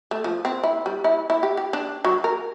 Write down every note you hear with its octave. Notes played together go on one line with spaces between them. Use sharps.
A3
F3
C4
E4
G3
E4
E4
G4
G4
D4
F#3
A#4